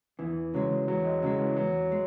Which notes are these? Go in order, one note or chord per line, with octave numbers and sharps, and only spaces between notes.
E2 E3
C#3 F#3 G#3
E2 F#3
G#3
C#3 F#3 G#3
E3
E2 F#3
G#3